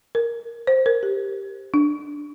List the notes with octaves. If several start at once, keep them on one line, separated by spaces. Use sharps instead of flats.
A#4
C5
A#4
G4
D4